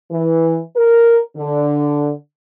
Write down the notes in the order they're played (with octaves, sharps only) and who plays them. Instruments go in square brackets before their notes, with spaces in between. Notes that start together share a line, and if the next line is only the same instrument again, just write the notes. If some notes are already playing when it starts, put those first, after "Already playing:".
[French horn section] E3
A#4
D3